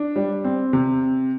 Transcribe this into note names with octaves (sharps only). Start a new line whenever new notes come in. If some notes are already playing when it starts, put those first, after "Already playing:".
Already playing: D4
G3
C4
C3